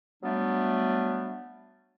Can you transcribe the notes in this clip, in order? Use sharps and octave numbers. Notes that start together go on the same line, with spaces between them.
F#3 G3 A3 B3 D4